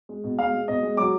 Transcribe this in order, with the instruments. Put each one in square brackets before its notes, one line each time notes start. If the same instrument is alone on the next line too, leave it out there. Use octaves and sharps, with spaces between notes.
[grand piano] G#3
B2
G#3 F5
G#3
B2 D#5
G#3
F#3 D6